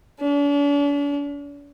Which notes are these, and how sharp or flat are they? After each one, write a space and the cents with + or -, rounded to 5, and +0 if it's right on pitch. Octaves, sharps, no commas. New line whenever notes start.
D4 -45